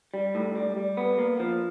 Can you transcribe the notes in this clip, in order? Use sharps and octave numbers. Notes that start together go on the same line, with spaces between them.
G3
A2
G3
G3
B3
A#3
F3